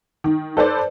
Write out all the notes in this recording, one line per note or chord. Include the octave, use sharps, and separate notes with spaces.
D#3
A4 B4 C5 D5